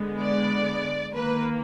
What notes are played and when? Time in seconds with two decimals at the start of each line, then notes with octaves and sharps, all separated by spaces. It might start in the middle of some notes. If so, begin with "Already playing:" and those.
Already playing: D3 G#3 B3
0.19 D5
1.13 D#3 A#3 B4